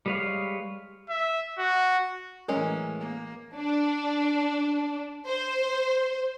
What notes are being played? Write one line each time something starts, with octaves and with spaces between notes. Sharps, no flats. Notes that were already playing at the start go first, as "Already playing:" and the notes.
G3 G#3 B4 C#5 F5
E5
F#4
A2 E3 F#3 G#3 C#4 A#4
A#3
D4
C5